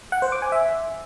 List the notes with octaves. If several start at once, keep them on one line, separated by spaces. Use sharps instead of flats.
F#5
C5
D6
G#5
E5